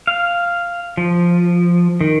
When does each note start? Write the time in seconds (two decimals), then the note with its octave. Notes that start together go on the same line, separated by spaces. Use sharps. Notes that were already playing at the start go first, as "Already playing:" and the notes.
0.07 F5
0.97 F3
2.01 D#3